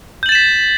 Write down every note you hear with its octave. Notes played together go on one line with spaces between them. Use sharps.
G6 A6 B6 E7 F#7